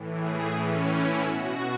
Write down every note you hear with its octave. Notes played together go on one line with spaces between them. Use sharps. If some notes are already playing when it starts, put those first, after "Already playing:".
Already playing: A2 E3
G#4
A2 E3 C#4
E4
B2 F#4